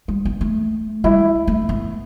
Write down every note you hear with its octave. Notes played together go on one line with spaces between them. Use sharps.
G3
B3
A3
G3 E4
A3
B3